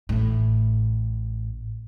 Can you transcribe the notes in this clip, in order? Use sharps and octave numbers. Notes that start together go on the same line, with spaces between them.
A1 A2